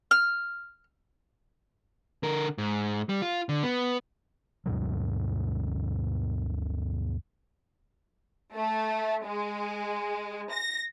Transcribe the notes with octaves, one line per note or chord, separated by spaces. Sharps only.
F6
D3 A#4
G#2
G3
F4
D3
B3
D2 G2 B2 F#3
A3
G#3
A#6